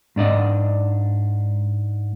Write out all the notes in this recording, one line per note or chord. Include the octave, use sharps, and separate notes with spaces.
G#2 D4 D5 D#5